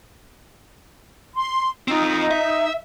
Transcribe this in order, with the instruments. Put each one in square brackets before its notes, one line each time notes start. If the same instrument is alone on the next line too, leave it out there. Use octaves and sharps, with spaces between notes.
[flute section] C6
[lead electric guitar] C4 F4 [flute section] D#4
[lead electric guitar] E5